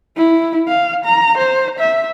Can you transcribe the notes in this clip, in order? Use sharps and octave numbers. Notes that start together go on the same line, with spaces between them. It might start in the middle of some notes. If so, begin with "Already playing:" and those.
E4
F5
A#5
C5
E5